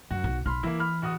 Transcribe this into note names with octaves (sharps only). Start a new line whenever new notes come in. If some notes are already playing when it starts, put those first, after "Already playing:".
F#2 F#4
B1
B1 B5 C6 F6
E3 A#3 E4
B5 F6
D1 F#4 D#6